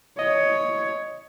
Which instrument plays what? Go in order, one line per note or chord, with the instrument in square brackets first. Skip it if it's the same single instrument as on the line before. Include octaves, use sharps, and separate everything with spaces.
[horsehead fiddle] C#5 [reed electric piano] D#5